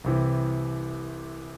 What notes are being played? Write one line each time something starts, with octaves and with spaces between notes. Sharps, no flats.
C2 C3 E3